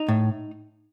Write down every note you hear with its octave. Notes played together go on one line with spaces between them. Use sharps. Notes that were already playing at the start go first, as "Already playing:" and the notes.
Already playing: D#4
A2